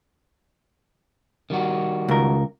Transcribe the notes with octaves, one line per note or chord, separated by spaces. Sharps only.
D#3 G3 F#4
C#2 A#4